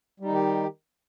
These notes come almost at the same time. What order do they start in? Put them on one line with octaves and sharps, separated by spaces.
G3 D#4 D#3 G4